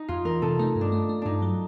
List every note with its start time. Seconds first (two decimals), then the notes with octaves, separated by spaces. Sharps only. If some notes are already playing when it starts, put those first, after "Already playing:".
Already playing: D#4
0.08 F2 F4
0.25 E3 A#4
0.42 C3 A4
0.59 A3 D#4
0.76 G2
0.81 D4
0.92 A3
1.09 A3
1.22 G2 D4 D#4
1.42 F#3